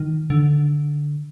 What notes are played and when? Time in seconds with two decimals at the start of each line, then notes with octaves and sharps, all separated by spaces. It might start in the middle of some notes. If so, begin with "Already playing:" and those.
Already playing: D#3
0.30 D3